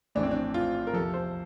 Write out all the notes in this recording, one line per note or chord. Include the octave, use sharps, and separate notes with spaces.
A#1 A2 E3 D4
C4
D4
F4
A#4
E2 C3 F3 A4
C5